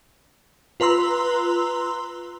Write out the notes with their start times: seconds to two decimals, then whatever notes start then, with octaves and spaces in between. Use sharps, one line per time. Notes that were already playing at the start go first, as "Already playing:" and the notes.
0.80 F4 B4 A#5 C6 E6